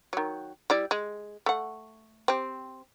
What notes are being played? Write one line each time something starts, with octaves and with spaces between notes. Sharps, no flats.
D#3 F#3
G3 E4 D5
G#3
A3 F#5
C4 G4